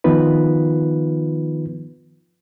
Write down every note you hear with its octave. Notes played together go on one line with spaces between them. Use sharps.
D#3 F3 B3 D#4 F4 B4